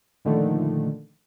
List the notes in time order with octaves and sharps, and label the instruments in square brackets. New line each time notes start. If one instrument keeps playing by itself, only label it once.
[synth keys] A#2 D3 D#3 F3 A3